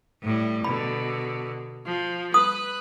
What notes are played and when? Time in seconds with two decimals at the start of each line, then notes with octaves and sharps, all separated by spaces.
0.22 A2 G3
0.65 B2 D3 B5
1.85 F3
2.34 B4 D#6